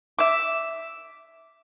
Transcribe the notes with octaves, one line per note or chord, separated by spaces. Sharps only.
E5 D6